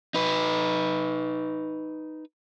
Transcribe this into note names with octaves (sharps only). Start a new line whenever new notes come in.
D#4 B4